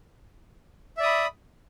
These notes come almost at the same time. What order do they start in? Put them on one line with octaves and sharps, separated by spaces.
E5 D5 D#6 B5